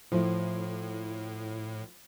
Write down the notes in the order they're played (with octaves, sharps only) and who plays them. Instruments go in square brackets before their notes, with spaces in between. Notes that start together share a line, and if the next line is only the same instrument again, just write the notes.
[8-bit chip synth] A2 [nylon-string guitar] F3 A3 E4